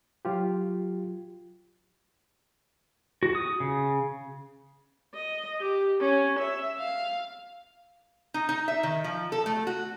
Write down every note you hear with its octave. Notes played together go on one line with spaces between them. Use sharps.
F#3 F4 G4
F#4
D#6
C#3
D#5
G4
C#4
E5
F5
D#4
D#4
E5
D#3
F3
A4
A3
F#4